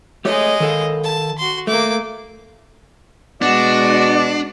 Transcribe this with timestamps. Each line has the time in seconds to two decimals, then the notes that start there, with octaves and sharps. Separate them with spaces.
0.25 G#3 A3 G4 C#5 D#5
0.60 D#3 A4 F5
1.04 A5
1.38 F#4 C6
1.67 A3 A#3 D6
3.42 B2 G#3 D4 F#4 D5